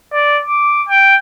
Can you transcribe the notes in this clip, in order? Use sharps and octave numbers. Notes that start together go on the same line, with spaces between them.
D5
D6
G5